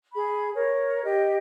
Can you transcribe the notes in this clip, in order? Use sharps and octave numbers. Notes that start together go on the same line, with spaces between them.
G#4 B5
A#4 C#5
G4 D#5